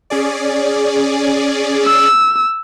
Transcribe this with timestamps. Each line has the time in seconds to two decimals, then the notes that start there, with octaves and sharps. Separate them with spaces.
0.10 C#4 G#4 D5
1.85 E6